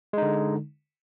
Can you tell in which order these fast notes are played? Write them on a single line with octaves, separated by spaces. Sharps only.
G#3 D#4 D3